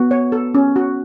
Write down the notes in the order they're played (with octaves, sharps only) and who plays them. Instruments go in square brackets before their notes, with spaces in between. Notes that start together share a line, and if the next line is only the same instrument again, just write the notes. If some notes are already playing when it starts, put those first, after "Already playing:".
Already playing: [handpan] B3 [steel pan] F#4
[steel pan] C#5
A4
C#4
F#4